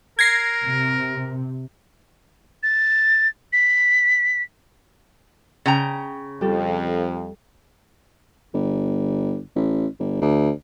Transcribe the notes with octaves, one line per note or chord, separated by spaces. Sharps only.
A#4 G#6 A#6 C7
C3
A6
B6
C#3 G5 A#5
F2 G3 G4 A4
G1
A1
G1
D2